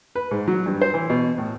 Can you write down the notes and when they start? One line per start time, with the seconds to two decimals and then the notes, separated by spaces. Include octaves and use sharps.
0.15 B4
0.31 G#2
0.48 F#3
0.66 G2
0.81 C5
0.94 E3
1.10 B2
1.38 A2